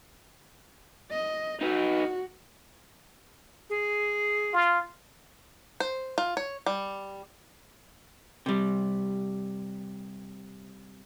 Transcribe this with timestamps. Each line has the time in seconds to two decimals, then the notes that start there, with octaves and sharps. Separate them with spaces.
1.10 D#5
1.61 D#4 F#4 B4
3.70 G#4
4.53 F4
5.80 C5
6.18 F4
6.37 C#5
6.66 G3
8.46 C3 G3